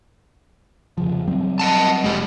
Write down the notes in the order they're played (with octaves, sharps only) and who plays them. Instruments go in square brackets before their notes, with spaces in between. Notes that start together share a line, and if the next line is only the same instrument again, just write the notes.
[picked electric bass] F2 C#3 F3
F#3 G3 C4
[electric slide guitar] D#5 F#5 A5
[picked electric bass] F1 [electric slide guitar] G#3 G4